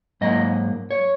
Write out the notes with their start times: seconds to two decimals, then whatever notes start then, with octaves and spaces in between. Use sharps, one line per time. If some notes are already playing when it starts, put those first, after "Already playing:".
0.21 G#2 F#3 A#3 D#5
0.91 C#5